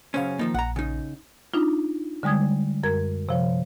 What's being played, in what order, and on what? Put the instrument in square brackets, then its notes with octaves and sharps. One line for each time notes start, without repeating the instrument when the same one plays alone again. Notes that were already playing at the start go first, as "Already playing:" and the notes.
[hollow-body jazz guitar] F#2 C#3 C#4 [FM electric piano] C5 F5
[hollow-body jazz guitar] D#3 F3 D#4 [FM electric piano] A#3
[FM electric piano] A#1 [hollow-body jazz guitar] F#5 A#5
[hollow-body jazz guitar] C#3 D#4
[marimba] D4 D#4 F4
D3 G3 G#3 D#6 G#6
F#2 A#4 G#6
C3 F3 C#5